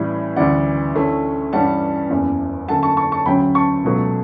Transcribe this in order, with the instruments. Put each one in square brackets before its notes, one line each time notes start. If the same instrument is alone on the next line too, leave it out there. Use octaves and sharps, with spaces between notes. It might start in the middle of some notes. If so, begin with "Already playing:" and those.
Already playing: [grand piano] A1 A2 E3 G3
D2 C#3 E3 G3 D5 F#5
D2 D3 A3 C#4 E4
G2 E3 G3 C#4 F#5 A5
F#1 E2 C#3
F#2 D3 A3 F#5 A5
A5 C#6
A5 C#6
A5 C#6
D2 C#3 F#3 C#4 G5 B5
A5 C#6
C#2 B2 F#3 A3